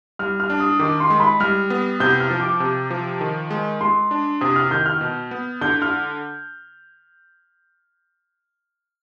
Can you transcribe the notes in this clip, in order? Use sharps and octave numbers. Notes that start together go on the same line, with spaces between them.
G3 F6
F6
D4
D#6
D#3 D6
C6
G#3
B5
G3 F6
B3
C3 G6
F6
F3
D6
C3
F3
D#3
G#3
G#3 C6
D4
C3 D#6
F6
D#3 G6
F6
B2
B3
D3 G6
F6